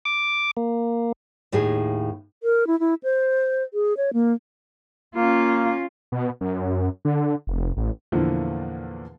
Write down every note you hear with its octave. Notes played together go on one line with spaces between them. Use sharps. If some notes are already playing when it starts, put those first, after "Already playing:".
D6
A#3
D#2 A2 D#4 G#4
A#4
E4
E4
C5
G#4
C#5
A#3
A#3 C#4 F4
B2
F#2
D3
F1
A1
E2 A#2 D3 E3 F3 A#3